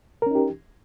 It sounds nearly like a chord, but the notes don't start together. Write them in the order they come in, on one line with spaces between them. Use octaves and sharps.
A#4 C#4 D#4 G4